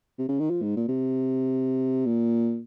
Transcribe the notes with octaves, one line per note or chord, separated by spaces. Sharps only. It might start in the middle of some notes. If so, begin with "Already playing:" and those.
C3
C#3
D#3
F3
G#2
A#2
C3
A#2